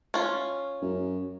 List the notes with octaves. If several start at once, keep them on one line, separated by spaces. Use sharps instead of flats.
C#4 F4
F#2